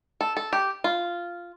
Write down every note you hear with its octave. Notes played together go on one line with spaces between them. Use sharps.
A4
A4
G4
F4